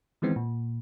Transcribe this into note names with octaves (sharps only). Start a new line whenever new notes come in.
D#3 E3 G#3 B3 C4
A#2